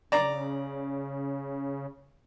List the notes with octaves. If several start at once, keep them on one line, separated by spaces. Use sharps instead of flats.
C#3 D5 A#5